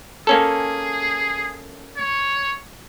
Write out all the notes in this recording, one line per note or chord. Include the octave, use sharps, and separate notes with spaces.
A#3 C#4 G#4 A4
C#5